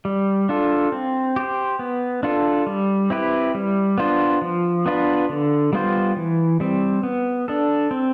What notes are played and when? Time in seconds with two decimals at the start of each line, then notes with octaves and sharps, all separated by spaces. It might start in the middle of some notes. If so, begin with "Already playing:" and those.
0.05 G3
0.49 D4 F4 A4
0.92 C4
1.36 G4 C5
1.79 B3
2.23 D4 F4 A4
2.67 G3
3.10 C4 E4 G4 B4
3.55 G3
3.98 B3 D4 F4 C5
4.42 F3
4.86 B3 D4 F4 B4
5.29 D3
5.73 G3 B3 F4 C5
6.17 E3
6.60 G3 C4
7.03 B3
7.48 D4 A4
7.91 C4